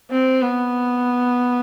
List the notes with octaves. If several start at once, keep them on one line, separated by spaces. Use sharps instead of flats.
C4
B3